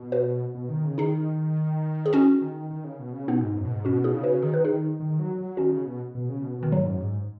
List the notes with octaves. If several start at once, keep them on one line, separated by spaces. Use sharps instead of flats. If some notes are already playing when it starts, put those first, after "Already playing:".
Already playing: B2
F#4 B4
B2
D#3
C#3
D#3 D#4 G#4
G#4
C#4 F#4
D#3
D#3
C#3
B2
C#3
B2 B3 D#4
G#2
F#2
B2
G#2
B2 C#4 F#4
D#4 G#4
C#3
F#4 B4
D#3 G#4
D#3 B4
D#4 G#4
D#3
D#3
F#3
F#3
D#3 C#4 F#4
C#3
B2
B2
C#3
B2
B2 D#3
G#2 F#3
F#2
G#2